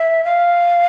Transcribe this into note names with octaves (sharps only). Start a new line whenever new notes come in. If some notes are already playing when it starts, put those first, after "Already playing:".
Already playing: E5
F5